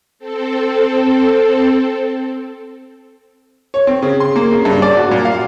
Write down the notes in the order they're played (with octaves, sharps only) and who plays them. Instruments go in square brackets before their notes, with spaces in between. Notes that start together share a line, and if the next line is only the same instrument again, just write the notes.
[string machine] C4 A4
[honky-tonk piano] C#5
C4
C#3
C6
A#3
C#3
G2
D5
F#4
A#2
F5